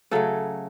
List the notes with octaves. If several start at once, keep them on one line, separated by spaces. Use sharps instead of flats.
C#3 F#3 A3 A4